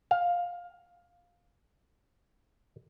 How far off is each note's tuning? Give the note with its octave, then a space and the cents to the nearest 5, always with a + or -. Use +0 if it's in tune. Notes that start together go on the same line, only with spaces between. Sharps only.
F5 +15